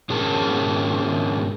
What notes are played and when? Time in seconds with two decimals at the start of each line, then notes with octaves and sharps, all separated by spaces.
0.10 G#2 C#4 G#4 A#4 A5